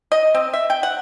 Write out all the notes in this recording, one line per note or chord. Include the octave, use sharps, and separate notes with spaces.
D#5
C4
E5
G5
F#5